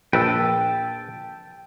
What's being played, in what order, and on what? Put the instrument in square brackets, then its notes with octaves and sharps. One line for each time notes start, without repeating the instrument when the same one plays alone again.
[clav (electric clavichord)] A#1 B4 [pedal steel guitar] G5 A5 E6